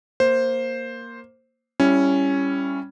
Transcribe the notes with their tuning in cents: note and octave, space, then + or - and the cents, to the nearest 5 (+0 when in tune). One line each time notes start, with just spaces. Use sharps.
A#3 +0 C5 +5
G3 +0 C#4 +0 E4 +15